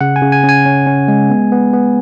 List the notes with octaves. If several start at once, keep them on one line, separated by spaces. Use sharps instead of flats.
C#3 F#5
G#5
C#3
G#5
C#4
G#5
C#4
C#4
G#3
B3
B3
B3